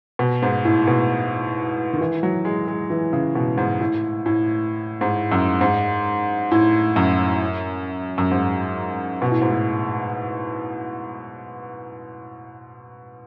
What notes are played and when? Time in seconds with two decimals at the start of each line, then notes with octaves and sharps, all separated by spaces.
0.19 B2
0.42 G#2
0.65 A2
0.87 B2
1.93 D#3
2.00 E3
2.23 F#3
2.45 G#3
2.68 G#3
2.90 E3
3.13 C#3
3.35 B2
3.57 G#2
3.81 A2
4.26 A2
5.01 G#2
5.32 F#2
5.61 G#2
6.51 A2
6.96 F#2
8.18 F#2
8.31 G#2
9.22 B2
9.31 A2
9.41 G#2
9.51 A2